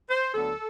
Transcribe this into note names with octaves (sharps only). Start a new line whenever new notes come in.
C5
D2 D3 F#3 B3 A4